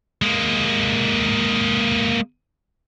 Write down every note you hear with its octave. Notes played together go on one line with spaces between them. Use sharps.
G#3 A#3